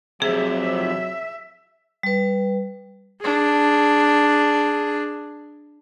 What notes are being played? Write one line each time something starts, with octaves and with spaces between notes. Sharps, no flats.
F2 C3 F#3 G#4 E5
G3 B4
D4 G#4